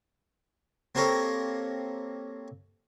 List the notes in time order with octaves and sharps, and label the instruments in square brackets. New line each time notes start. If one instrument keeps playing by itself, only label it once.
[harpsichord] A#3 C4 G4 A4 A#4 C#5